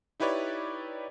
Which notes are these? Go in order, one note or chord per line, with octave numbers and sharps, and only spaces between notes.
D#4 E4 G4 B4 C#5 D5